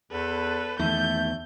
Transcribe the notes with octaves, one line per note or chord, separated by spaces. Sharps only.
E2 A4 B4
E2 D#3 A3 G6